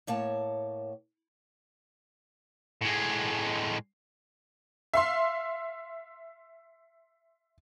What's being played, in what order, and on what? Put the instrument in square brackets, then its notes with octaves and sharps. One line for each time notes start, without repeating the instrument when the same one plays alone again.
[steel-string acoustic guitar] A2 A#3 C#5 A5
[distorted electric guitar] A2 G#3
[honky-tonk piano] E5 F5 C6